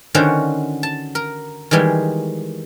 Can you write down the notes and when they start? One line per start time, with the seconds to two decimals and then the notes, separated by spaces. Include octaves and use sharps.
0.15 D3 D#3 C#4 F#4 C5
0.83 A5
1.15 A#4
1.71 D#3 E3 G3 G#3